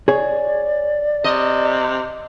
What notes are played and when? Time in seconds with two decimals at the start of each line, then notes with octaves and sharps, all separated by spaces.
0.08 G#4 C#5 D5
1.24 C3 D#5